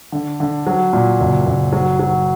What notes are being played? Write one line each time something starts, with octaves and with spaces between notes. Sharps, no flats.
D3
D3
F#3
A#2
F#1
F#1
F#3
F#3